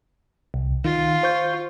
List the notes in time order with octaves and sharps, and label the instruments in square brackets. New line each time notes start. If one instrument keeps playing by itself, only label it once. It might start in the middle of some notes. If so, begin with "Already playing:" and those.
[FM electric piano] C2
[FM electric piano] D#3 [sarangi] F4
[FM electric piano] C5 C#6 G6